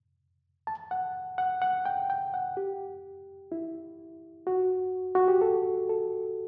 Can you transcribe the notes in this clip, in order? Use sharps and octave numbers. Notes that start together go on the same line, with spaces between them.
A5
F#5
F#5
F#5
G5
G5
F#5
G4
E4
F#4
F#4
G4
A4
A4